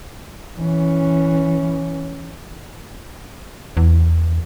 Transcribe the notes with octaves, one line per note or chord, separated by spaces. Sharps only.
E3 C#4
E2